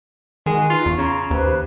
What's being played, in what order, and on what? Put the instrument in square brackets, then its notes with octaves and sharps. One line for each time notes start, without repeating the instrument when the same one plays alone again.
[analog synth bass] D#3 [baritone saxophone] G#3 [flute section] F#4
[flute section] D#4 B4 [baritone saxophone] F4
[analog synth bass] E2 [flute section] F5 C#6
[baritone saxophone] C#3 [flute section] A#5
[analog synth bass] D#2 [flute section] G4 B4 C5